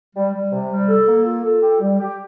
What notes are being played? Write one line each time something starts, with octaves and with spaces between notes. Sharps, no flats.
G3
G3
C3
G3
A4
A#3
F4
A4
G4
G3
G4